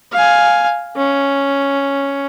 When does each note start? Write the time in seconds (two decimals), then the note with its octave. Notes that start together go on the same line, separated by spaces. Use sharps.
0.12 F5 G#5
0.96 C#4